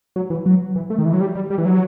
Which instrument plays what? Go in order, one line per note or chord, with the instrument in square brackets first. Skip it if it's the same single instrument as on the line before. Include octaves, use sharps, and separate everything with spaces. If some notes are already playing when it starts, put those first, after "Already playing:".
[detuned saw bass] F#3
E3
F#3
E3
A3
D#3
E3
F#3
G3
G3
G3
E3
F#3